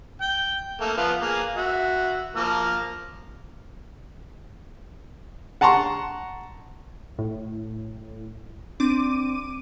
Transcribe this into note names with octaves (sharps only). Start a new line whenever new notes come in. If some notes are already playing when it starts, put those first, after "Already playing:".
G5
A3 A#3
F3 B3 F5
A#3 G#4 F5
F#4 E5
F3 A#3 F6
F#5 A5 A#5 C6 C#6
A2
C4 D4 D6 D#7